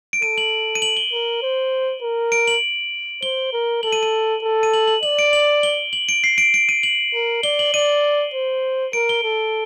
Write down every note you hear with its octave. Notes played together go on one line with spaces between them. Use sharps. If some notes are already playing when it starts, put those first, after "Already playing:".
D7
A4 D#7
F#7
D#7
F#7
G7
A#4
C5
A#4
D7
F#7
C5 G7
A#4
A4 F#7
D#7
D#7
A4
D#7
F#7
F#7
D5 F#7
D7
F#7
G7
F#7
D7
C7
D7
D7
D#7
F#7
A#4
D5 G7
F#7
D5 D#7
C5
A#4 D7
G7
A4